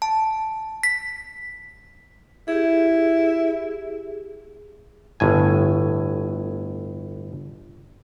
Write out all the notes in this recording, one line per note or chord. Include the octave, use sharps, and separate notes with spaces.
A5
B6
E4 G4 G#4
G1 A2 G#5